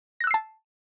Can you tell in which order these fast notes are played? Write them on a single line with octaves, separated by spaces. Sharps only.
A#6 F#6 E6 C7 A5